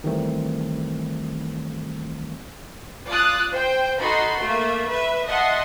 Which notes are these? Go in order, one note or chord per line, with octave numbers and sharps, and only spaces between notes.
D#3 E3 G3 A3 C4
F4 D5 A5 D#6 F#6 A6
C5 G5
D#4 F#4 A4 B5 C6
A3 A#3 E5
B4 E5
D#5 E5 F#5 A5 C6